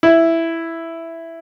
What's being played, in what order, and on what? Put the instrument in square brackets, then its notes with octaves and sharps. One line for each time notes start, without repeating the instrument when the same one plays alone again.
[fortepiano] E4